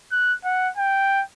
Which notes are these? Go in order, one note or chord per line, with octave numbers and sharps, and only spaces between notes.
F#6
F#5
G5